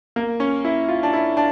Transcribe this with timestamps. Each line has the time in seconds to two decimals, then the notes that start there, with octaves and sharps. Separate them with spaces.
0.16 A#3
0.40 C#4
0.64 E4
0.88 F4
1.03 D4
1.13 E4
1.37 D4